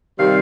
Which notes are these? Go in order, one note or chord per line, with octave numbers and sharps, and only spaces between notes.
C3 D#3 G3 C4 F5